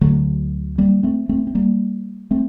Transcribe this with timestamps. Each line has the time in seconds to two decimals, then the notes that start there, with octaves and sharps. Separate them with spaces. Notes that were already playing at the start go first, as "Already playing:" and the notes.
0.01 D2 D3 F#3 A3
0.78 G3 A#3
1.03 A3 C4
1.29 A3 C4
1.47 C4
1.55 G3 A#3
2.31 A3 C4